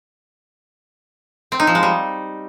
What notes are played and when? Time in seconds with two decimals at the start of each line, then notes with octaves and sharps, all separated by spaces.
1.52 C4
1.60 D#4
1.67 F3
1.75 G#3
1.83 G3